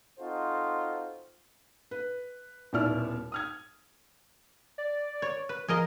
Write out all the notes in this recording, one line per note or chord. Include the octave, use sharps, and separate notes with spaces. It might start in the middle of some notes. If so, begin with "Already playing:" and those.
C4 D#4 F4 F#4 A4 C5
B4
D#1 D#2 B2 E4 D5 F6
D#6 F6 G#6
D5
C#5
B4
F3 G#4 A#4 D#5